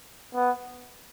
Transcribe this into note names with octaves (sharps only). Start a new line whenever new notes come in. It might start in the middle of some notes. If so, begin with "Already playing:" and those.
B3